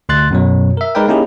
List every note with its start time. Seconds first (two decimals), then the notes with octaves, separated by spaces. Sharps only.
0.09 D2 C6 F#6 A6
0.31 F#2 B2 F#3
0.77 A#4 E5
0.95 G#3 D#4 A#4 B4 D5 G5
1.08 A#3 C#4 D#4 E4 G4 G#4